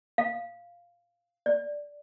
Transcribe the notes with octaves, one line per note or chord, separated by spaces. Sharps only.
F5
D5